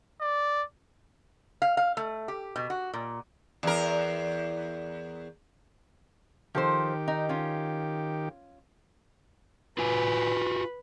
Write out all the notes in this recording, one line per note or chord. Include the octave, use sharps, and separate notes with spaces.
D5
F5
F5
A3
G4
B2
F#4
A#2
E2 A#4
D#3 F3 G4 A4 C5
D#4
C#4 F4
F4 F#4 B4 G#5